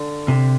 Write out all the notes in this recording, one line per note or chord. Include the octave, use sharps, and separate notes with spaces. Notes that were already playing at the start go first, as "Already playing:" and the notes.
Already playing: D3
C3